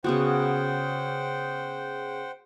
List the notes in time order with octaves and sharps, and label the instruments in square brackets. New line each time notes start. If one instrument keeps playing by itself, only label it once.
[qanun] C#3 B3 F#4 [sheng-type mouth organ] C5 F#5 G5